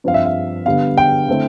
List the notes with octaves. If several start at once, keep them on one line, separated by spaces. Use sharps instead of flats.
G2 F3 C4 F5
E5
F5
D3 G3 B3 D4 F5
G5
D3 A3 C4 E4